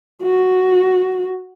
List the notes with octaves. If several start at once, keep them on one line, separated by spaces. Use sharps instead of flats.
F#4